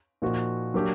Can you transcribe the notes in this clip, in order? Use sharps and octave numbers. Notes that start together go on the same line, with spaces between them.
A#2 F3 A#3 D#4 F#4
F#3 A#3 D4 G4